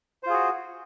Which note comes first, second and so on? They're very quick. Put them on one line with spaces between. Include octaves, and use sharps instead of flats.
C5 F4 G#4 F#4